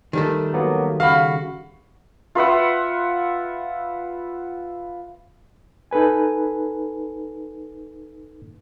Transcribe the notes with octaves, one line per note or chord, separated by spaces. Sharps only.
D#3 G3 A3
F#3 A#3 B3
C#3 F#4 F5 B5
F4 B4 E5 F#5
D#4 A4 B4 G#5